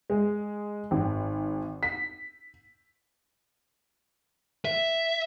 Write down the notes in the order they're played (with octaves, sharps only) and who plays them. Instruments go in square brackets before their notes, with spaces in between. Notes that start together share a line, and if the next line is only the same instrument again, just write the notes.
[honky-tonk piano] G#3
G#1
B6
[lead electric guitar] E5